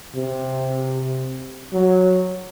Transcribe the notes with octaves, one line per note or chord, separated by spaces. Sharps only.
C3
F#3